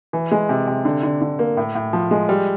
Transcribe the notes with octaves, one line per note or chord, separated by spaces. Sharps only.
E3
G#3
C3
C3
D3
D3
D3
A#3
A2
A2
F3
G#3
G3